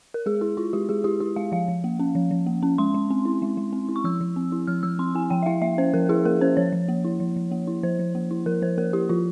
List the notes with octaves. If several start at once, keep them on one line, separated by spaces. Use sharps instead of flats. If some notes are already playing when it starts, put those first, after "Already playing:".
A#4
G#3 G#4
E4 G#4
E4 F4
G#3 G4
G#3 G#4
E4 G4
E4 G4
G#3 F5
F3 F5
F3
A#3
C#4
F3
F3
A#3
C#4
G#3 C6
G#3
C4
E4
G#3
G#3
C4
E4
C#6
F3 E6
F3
C4
E4
F3 F6
F3 E6
C4 C6
E4 G#5
F3 G5
E5
E4 F5
A#3 E5
C#4 C5
F3 A#4
E4 G#4
A#3 A#4
C#4 C5
F3 C#5
F3
A#3
E4
F3
F3
A#3
E4
F3 C5
F3
A#3
E4
F3 A#4
F3 C5
A#3 A#4
E4 G4
F3 F4